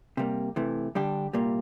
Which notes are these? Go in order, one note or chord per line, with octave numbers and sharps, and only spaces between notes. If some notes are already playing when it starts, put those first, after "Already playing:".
C3 G3 A#3
C3 E3 A3
D3 G3 D4 G4
C2 A#2 G3 A#3